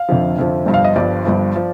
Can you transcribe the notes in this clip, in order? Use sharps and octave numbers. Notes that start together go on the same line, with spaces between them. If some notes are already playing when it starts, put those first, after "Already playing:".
Already playing: F5
F1 F2 D3 F3
F1 F2 D3 F3
G1 G2 F3
F5
D#5
G1 G2 F3 D5
G1 G2 F3
F3